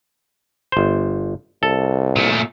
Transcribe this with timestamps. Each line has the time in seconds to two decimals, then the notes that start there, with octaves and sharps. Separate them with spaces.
0.72 G1 C5
1.63 C2 A4
2.16 A#2 A3